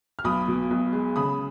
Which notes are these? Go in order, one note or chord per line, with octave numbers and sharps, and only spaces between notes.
F6
B1 B5 D#6
B2
B1
G#3
C#3 B5 D#6